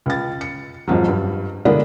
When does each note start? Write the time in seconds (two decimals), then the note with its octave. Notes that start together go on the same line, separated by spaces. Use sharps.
0.06 C#2 A6
0.41 C#7
0.88 F2 G#2 F3 F#3
1.08 G2
1.65 D3 G#3 A#3 B3 D4 E4